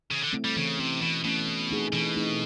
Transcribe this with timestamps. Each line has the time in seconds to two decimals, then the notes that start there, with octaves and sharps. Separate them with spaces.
0.10 C#3 E3
0.22 D3
0.33 A3 C4 E4
0.45 G3
0.56 C#3 E3
0.79 C3 A3 C#4
1.02 B2 E3
1.24 B2 A3 C#4
1.48 E3
1.71 A3 C4 D#4 G#4
1.93 B2 E3
2.16 A3 C4 D#4 G#4